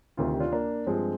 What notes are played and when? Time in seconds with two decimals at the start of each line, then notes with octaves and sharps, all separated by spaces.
0.17 D2 C3 D#3 F4
0.30 G4
0.40 D4 F4
0.52 A#3 D4
0.87 G2 F3 G#3 C4